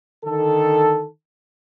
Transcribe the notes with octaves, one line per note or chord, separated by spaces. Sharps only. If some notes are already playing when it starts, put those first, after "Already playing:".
D3 D#3 A4